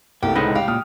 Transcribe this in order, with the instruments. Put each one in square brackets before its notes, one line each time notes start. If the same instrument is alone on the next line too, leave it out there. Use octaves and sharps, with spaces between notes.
[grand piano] C2 A3 [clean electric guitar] A#3 [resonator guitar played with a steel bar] G4
[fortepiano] C#2 A2 [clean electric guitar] G#3 D#4 B4 [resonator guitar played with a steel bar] C4
[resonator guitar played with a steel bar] G4 [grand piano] F5
[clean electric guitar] A#2 [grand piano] D#6 F6